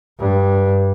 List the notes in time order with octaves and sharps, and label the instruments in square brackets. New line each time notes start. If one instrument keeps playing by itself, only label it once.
[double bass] G2